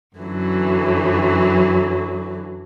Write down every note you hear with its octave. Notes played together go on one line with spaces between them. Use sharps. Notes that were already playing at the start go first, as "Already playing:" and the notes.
F#2 D3 E3 F#3